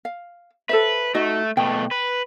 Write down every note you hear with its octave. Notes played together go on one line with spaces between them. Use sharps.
F5
A4 B4 C5 E5
A3 D#4 F#4 D#5
B2 A3 G5
B4